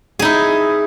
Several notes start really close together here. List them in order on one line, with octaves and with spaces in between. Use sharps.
G#4 D#4 E4